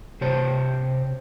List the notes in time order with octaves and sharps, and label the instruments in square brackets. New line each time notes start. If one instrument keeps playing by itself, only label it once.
[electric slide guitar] C3 G4 C5 C#5 A5